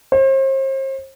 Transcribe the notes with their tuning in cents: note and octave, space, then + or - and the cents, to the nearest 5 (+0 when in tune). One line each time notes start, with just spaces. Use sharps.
C5 +40